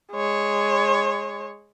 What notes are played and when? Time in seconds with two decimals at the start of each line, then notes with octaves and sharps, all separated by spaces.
0.13 G#3 C#5